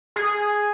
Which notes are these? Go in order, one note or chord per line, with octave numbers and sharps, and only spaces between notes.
G#4